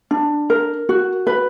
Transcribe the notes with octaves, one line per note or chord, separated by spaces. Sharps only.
D4
A#4
F#4
B4